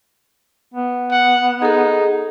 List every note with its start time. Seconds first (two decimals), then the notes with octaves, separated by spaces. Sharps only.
0.74 B3
1.11 F#5
1.62 D#4 G#4 A4